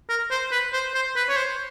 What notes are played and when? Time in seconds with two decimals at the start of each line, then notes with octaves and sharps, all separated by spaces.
0.09 A#4
0.31 C5
0.52 B4
0.73 C5
0.94 C5
1.16 B4
1.29 C#5
1.37 C5